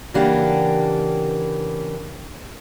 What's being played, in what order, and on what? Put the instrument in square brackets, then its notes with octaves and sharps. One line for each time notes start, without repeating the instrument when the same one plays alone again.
[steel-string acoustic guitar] C#3 E3 A#3 D4 G4 F#5